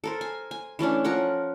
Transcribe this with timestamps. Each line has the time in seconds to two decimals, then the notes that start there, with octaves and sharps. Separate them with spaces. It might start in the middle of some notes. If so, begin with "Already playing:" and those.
0.04 A4 A#4 C5
0.21 G#5
0.51 G#5
0.79 E3 A3 C#4 D4
1.05 F3 A#4 C#5 F#5